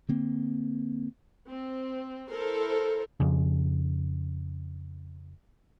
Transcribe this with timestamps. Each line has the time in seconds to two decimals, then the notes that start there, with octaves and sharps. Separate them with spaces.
0.09 D3 A#3 C4
1.48 C4
2.28 E4 A4 A#4 C5
3.20 F2 C#3